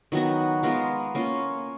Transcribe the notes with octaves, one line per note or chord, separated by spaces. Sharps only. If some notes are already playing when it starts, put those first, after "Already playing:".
D#3 F#3 B3 F#4
G#3 B3 F4 A#4
A#3 C#4 F4